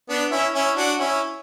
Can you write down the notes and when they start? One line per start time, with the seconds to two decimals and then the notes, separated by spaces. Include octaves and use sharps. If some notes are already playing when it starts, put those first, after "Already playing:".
0.09 B3 D4
0.31 C#4 E4
0.54 C#4 E4
0.76 D4 F#4
0.99 C#4 E4